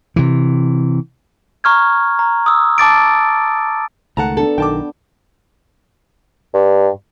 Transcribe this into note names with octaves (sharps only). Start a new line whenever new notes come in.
C3 E3
A#5 C#6 F6 G#6
A#5
D#6 E6
A5 D6 A6 D7
C#2 D#3 A3 F#5 A5 A#5
B3 D4 A4
B1 D#3 G5 A5 D6
G2